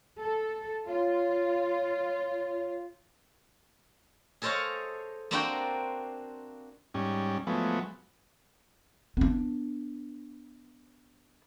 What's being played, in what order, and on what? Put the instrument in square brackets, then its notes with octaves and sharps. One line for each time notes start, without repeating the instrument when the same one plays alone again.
[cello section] A4
[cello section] F4 [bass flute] C#5
[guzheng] G#4 A4 C5 C#5 D#5 F5
A#3 C4 D4 F#4 C5 G5
[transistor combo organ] G#2 G3 C#4
F3 F#3 G#3 A3 B3
[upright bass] B3 D4